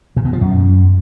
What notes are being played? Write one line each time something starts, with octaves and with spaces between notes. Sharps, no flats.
A#2
B2
F3
F#2